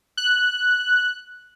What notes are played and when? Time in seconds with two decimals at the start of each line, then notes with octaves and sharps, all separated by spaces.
0.17 F#6